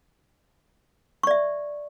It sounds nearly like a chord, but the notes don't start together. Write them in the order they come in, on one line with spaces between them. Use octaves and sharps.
C#6 D5 E5